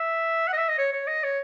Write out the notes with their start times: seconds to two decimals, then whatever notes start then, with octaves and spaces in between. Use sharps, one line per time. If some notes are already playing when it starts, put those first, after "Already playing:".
Already playing: E5
0.48 F#5
0.53 D#5
0.57 E5
0.68 D#5
0.78 C#5
0.93 C#5
1.07 D#5
1.23 C#5